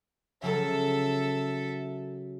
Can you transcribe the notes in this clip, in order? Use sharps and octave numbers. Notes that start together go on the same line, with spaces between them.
C#3 F#3 A4 E5